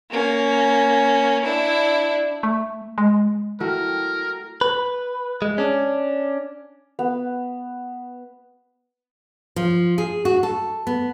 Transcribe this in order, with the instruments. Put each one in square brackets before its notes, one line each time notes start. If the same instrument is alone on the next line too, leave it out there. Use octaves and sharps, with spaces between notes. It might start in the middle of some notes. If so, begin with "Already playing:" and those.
[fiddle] A#3 C#4
D4 E4
[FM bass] A3
G#3
[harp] A3 F#4 [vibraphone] E4 G5 [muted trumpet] A#4
[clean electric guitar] B4
G#3
C#4 D4
[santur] B3
[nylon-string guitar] F3
G#4
F#4
A4
B3